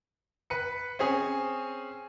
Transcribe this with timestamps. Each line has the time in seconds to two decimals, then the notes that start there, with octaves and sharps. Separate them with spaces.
0.50 B4 C#7
0.99 C4 C#4 G#4 G#5